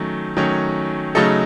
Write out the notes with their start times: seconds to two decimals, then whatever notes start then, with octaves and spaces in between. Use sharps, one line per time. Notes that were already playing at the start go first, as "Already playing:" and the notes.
Already playing: D#3 F#3 A3 C#4
0.37 D#3 F#3 A3 C#4
1.15 C#3 F#3 A3 D#4 A4